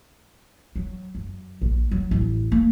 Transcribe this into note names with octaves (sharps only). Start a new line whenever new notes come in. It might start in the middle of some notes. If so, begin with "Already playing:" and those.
F#3
F#2
A#1
F#3
A1
A#3